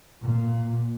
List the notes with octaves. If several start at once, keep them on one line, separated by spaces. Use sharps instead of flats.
A#2